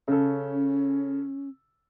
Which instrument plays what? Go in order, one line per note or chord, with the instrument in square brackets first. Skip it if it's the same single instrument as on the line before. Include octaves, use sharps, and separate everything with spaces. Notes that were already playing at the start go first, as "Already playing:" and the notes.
[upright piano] C#3 A4 [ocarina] C#4